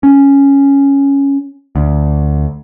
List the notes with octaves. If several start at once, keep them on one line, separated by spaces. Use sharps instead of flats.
C#4
D2